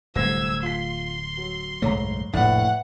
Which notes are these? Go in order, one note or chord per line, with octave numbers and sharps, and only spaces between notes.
D1 C2 A3 C5 E6 G#6 A#6
F4 C6 B6
F#3
F#1 B1 G#2 A3 C#5 A#5
F1 A#1 A2 B4 D5 F#5 A6